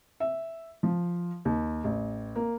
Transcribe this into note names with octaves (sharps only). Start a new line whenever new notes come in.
E5
F3
D#2
A1
A#3